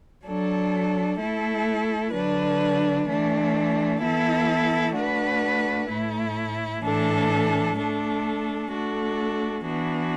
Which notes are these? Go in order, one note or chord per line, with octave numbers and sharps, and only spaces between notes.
F#3 D4 A4
A3 E4 A4
D3 F#3 D4 B4
E3 A3 D4
E3 B3 E4 A4
A3 D4 F#4 B4
A2 A3 E4
A2 E3 D4 A4
A3 D4 A4
A3 D4 F#4 A4
E3 B3 D4 F#4